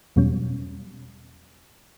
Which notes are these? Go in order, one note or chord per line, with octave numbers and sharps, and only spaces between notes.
E2 B2 F#3 G3 C#4